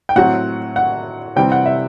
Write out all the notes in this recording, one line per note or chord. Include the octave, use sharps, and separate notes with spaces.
G5
A2 F#3 C4 F#5
F#5
C3 E3 G3 C4 G5
F#5
E5